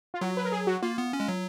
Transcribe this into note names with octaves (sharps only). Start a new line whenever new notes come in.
F4
F#3 F#4
B4
A#4
G#4
F#4
A#3 F4
B3
C#4
G#3
F#3